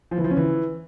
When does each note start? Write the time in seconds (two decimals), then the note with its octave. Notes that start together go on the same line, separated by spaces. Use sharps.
0.11 F3
0.18 E3
0.24 F3
0.31 C#4
0.37 E3